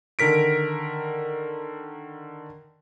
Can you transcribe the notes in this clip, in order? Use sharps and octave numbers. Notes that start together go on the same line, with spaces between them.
D3 D#3 A#4 B6 D7